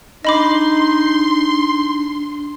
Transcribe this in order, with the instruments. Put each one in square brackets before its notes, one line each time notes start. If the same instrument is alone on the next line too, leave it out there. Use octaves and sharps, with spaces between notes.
[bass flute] D4 [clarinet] D#4 [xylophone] D#5 B5 D6 [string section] C6